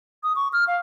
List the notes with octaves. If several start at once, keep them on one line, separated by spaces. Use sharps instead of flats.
D#6
C#6
F6
F5